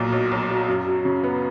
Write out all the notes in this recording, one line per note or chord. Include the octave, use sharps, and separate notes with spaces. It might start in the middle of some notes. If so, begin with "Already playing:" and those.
Already playing: B1 A#2 F#3
B1
B1
F#3
F#2
F#3
C#3
B3